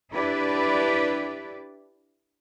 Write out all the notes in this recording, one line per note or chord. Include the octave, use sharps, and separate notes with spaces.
D4 E4 G4 B4 D5